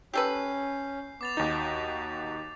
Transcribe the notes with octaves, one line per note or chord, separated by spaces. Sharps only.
C#4 G4 A4 B4 G6 C7
B3 D6 A6 F7
D#2 D#4 F#4